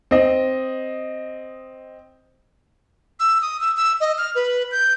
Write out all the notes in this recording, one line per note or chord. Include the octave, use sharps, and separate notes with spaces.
C4 D#5
E6
D#6
E6
E6
D#5
F6
B4
G6